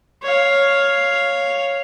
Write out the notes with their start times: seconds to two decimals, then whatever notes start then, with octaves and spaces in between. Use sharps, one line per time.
0.23 C#5 F5